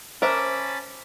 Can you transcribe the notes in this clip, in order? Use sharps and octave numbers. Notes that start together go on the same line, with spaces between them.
C#4 A#4 C5 E5 A5 B5 C6 D6